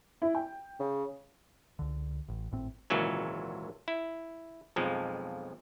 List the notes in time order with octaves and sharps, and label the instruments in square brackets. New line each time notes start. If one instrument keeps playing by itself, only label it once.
[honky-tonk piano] E4
G5
[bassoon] C#3
[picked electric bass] C#2 D3
A1
G#1 A2 C4
[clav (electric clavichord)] G#1 C#2 A#2 E3 F#3 C#4
E4
B1 F2 F3 G#3